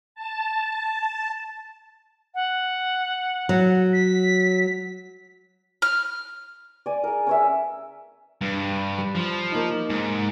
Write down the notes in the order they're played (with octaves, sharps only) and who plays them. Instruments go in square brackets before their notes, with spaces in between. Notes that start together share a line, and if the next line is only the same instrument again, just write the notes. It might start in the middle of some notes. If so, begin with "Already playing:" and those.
[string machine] A5
[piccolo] F#5
[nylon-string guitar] F#3
[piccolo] B6
[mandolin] F6
[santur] D5 G#5
G#4 A#4
C#4 C#5 E5
[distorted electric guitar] G2
[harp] G3 B5
[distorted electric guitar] F3
[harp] A#3 D#4
[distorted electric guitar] G#2